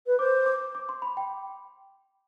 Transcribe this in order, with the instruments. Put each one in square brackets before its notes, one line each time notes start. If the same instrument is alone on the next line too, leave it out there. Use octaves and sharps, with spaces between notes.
[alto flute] B4
[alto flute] C5 [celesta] D6
[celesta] D6
D6
C6
B5
G5